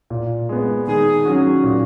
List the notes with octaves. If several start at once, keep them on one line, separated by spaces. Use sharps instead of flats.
A#2
G#3 B3
D#3 G#4
F#3 C#4 F#4
A#2